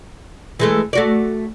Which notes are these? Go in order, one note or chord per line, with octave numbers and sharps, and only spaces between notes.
E3 G#3 A3
A3 F#4 D5